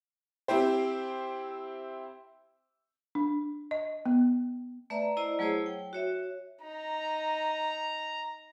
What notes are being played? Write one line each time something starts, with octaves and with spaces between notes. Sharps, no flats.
C4 E4 G4 C5
D4
D#5
B3
A3 B4 D5 E5 A#5
E4 C5 D5 D#5 A#5
F#3 A3 E4 G#4 C5 C#5
G5
F#4 C#5 E5
D#4 A#5